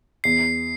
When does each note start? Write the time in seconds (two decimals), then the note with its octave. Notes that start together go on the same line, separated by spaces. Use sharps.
0.24 E2 C7